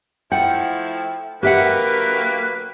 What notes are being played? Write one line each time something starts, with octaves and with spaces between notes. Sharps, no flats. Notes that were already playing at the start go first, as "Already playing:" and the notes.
F3 A3 E4 F#5 G5
D3 F#3 A#3 G4 B4 E5 F#5